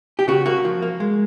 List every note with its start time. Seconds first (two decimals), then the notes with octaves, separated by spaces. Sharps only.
0.19 G4
0.28 C#3 F#4
0.46 A#3 F#4
0.65 F3
0.82 A#3
1.00 G#3